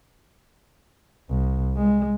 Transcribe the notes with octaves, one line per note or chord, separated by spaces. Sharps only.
C2
G#3